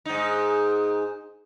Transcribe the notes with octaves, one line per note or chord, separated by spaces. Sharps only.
G#2 D#4